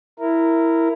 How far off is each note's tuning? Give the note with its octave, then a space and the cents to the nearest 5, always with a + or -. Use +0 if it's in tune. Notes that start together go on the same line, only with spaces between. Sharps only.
E4 +0 A#4 -10